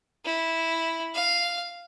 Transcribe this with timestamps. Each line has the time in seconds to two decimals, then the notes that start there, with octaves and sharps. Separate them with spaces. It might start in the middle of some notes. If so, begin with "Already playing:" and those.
0.24 E4
1.14 F5